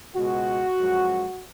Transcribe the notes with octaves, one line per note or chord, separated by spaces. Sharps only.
C#2 B2 G#3 F#4
F#2 F3 G#3